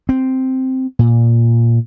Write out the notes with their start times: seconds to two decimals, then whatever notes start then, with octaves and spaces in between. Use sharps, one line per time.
0.09 C4
0.99 A#2